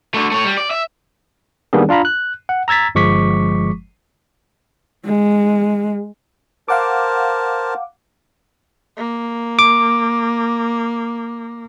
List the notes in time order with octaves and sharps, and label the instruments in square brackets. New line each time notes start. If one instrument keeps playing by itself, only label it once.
[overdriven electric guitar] D3 A3
A3 C#5
G3
D5
E5
[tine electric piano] D#3 G3 A#3 B3 D4 G#4
D4 F4 F5 A#5 B5
F#6
F#5
A#5 E6 G#6 A6 B6
G1 F3 G#3 C#6 D6 B6
[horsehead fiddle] G#3
[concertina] A#4 C5 A5 [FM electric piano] F5 F#5 D6
[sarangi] A#3
[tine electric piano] D6